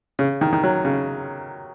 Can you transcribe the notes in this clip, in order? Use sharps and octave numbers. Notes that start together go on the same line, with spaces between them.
C#3
D#3
D#3
F#3
C#3